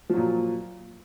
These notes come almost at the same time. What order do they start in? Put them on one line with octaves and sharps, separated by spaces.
F3 F#3 A#2